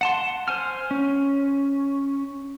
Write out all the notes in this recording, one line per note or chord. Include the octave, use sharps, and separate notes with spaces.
F#5 A5 C6
C5 G#5 F6
C#4